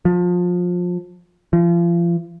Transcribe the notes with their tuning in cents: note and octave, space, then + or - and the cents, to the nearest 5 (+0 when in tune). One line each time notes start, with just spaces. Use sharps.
F3 +25
F3 -35